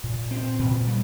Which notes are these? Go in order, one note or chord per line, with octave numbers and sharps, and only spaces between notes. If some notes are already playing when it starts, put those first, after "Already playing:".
A#2
C4
A#2
G3